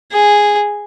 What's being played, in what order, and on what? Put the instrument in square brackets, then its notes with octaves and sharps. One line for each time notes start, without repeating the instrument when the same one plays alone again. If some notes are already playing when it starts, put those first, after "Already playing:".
[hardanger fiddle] G#4